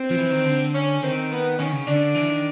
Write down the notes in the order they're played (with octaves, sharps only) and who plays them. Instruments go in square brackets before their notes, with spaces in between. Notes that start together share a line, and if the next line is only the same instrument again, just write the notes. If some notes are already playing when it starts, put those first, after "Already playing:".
Already playing: [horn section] C4
[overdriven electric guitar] F3
E3
D#3
D3
[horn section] C#4
[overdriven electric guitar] D#3 [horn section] C4
[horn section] B3
[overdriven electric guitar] D#3 [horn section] C#4
[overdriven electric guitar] C#3
[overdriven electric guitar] D3 [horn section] D4
[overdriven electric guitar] E3
D#3